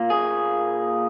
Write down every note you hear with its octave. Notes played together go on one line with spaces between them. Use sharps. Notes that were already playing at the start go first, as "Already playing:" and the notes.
Already playing: A#2 A#3
G#4